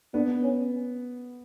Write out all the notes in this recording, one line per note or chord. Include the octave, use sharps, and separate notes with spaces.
B3 D4
C#4